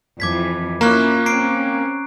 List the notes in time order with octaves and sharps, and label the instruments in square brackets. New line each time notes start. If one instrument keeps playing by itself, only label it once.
[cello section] F2 E3 F3 [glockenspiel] D6 G#6 B6
[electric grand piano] A#3 [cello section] C#4 E4 F4 [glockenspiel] A#5 C#6 F#6
[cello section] C4 C#4 [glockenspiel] A#5 C7 D7